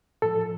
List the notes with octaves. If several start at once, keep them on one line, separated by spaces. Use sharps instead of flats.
A2 F3 A4